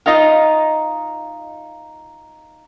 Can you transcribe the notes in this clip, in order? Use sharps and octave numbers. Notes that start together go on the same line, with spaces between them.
D#4 F4 D#5 F5